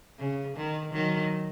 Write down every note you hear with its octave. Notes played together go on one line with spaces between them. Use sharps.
C#3
D#3
D#3 F#3